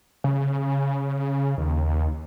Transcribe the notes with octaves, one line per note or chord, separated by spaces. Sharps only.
C#3
D#2